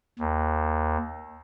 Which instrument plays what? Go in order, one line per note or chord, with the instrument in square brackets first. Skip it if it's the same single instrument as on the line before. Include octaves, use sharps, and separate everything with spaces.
[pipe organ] D#2